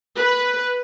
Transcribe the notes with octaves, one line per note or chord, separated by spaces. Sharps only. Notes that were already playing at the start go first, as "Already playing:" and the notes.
B4